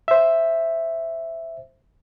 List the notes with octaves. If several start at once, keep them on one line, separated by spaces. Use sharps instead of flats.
C5 E5